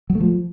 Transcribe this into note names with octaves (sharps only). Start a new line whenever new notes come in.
F#3
A3
F3